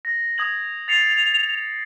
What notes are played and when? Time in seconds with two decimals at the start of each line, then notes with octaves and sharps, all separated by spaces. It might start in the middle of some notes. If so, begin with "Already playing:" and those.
0.05 A#6
0.38 D#6 G#6 F#7
0.88 A6 C7 C#7 F7